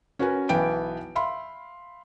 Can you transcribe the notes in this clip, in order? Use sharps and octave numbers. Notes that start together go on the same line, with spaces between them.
C#4 F#4 A#4 B4 G#5
B1 E3 B3 G5 G#5 D7
E5 F5 B5 C6